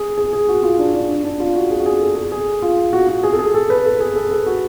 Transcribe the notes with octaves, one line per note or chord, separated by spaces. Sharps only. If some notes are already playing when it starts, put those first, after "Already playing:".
Already playing: G#4
G#4
G#4
F#4
F4
D4
D4
D4
D4
F4
F#4
G#4
F#4
G#4
A4
G#4
G#4
F4
F#4
F#4
G#4
A4
G#4
A4
B4
A4
G#4
A4
A4
F#4